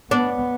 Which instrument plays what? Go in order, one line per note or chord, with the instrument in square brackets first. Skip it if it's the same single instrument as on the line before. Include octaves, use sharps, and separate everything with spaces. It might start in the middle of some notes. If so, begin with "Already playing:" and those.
[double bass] B3 [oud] D4